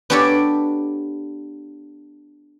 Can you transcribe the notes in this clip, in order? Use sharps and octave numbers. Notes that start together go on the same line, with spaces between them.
B3 D4 G4 A4 C#5 D5